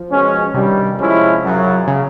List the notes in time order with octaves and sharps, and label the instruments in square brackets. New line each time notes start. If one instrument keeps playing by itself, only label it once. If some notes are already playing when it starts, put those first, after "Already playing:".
Already playing: [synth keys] F3
[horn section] B2 G#3 C#4
[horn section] G2 D#3 G3 [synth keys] C3
[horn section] F3 G#3 C#4 E4
F#2 C#3 F#3
[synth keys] C#3